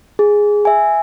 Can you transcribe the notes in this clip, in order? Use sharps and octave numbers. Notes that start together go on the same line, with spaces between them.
G#4
E5 G#5